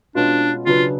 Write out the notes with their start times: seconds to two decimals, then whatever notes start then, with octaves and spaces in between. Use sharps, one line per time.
0.15 B2 G#3 C#4 D4 F4
0.66 C#3 F#3 B3 D4 F4